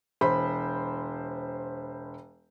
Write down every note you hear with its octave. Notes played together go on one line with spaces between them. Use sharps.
E1 C5 B5